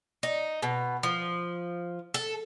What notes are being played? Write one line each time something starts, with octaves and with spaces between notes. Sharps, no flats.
D#4
B2
F3
A4